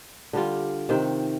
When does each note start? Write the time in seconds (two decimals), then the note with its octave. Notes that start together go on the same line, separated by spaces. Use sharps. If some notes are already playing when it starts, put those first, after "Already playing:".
0.33 D3 G3 F4
0.89 C3 D#3 C4